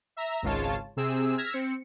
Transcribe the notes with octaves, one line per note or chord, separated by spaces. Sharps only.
E5 A#5
G#1 C#2 G#3 F4 C#5 A5
C3 C4 G#4 E6
E6 F6 G#6 A#6 B6
C4 C#7